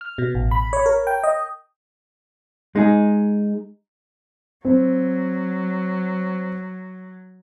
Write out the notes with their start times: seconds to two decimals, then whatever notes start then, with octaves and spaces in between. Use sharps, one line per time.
0.01 F6
0.18 B2
0.35 A1
0.51 B5
0.73 C#5
0.86 A#4
1.07 G5
1.23 D#5
2.76 G#3 D#4 G#4
4.65 F#3 C4